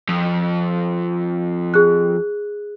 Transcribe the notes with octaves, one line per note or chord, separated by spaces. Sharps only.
F2
G#4 F#6